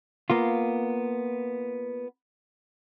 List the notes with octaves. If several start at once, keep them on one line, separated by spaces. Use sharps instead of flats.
A#3 B3 F4